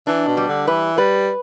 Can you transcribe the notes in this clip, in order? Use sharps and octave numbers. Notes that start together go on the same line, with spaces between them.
E3 D4
B2
G3
D3
E3 B4
G3 B4